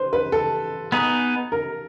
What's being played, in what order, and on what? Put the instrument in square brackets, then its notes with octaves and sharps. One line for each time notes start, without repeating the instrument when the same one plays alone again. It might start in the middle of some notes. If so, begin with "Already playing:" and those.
Already playing: [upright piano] B4 C5
B4
A4
[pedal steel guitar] B3 D#4 G#4
[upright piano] A#4